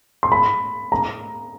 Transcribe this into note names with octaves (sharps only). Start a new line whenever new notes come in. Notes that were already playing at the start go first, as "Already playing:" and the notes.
C6
B5
A#5